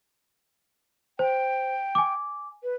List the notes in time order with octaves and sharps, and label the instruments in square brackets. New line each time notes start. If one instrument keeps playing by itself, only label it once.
[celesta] C5 [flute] G5
[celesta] G#5 D6
[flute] B4